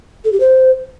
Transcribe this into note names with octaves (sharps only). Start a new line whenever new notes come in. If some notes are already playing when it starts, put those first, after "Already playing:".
A4
G4
C5